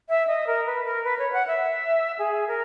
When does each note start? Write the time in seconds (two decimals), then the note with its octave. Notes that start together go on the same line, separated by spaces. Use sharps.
0.09 E5
0.27 D#5
0.47 A#4
0.66 B4
0.85 A#4
1.04 B4
1.19 C#5
1.33 F#5
1.47 E5
2.19 G#4
2.48 A#4